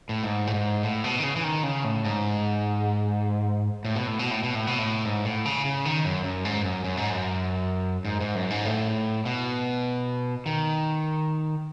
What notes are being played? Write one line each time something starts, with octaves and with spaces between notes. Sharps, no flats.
A2
G#2
A2
G#2
A2
B2
D#3
C#3
E3
D#3
C#3
A2
G#2
A2
B2
A2
B2
A2
B2
A2
B2
A2
G#2
A2
C#3
C#3
D#3
F#2
F#2
G#2
F#2
F#2
G#2
F#2
G#2
G#2
F#2
G#2
A2
B2
D#3